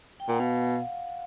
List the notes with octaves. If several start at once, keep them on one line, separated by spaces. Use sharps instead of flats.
G5
A#2 F#5
B2 F5